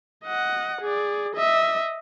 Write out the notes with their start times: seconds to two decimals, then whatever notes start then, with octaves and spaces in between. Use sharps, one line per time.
0.24 D#5 F#5
0.81 G#4 D5
1.35 D#5 E5